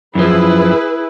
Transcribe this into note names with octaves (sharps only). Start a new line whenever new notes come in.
F#2 F3 E4 G#4 B4